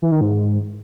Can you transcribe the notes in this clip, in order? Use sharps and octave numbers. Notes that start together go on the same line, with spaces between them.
E3
D#3
G#2